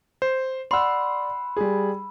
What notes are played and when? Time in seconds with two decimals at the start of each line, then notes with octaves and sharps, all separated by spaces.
0.22 C5
0.71 D5 F#5 B5 C6 E6
1.57 G3 G#4